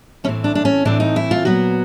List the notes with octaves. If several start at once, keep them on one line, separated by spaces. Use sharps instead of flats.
A2 E3 A3 C4 C#4
D4
D4
C#4
A2 E3 A3 C4 D4
D#4
E4
F4
A#2 F#3 B3 F#4